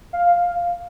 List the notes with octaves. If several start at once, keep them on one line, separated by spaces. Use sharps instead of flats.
F5